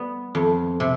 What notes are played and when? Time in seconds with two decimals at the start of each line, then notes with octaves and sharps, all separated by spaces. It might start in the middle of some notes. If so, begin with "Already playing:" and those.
Already playing: G3 B3
0.35 F2
0.80 C3